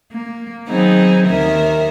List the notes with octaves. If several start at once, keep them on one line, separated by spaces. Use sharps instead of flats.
A#3
D#3 F#3 B3 C4 D#4 G#4
D#2 D#3 A#4 E5